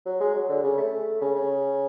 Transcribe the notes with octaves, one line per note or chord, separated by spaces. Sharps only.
F#3
G#3
F#3
D3
C#3
A3
C#3
C#3